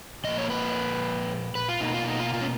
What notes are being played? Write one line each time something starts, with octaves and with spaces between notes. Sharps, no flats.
A#2 F3 A#3 D#5
C#5
B4
B4
F4
B2 A#3 D#4
F4
D#4
F4
F4
C#4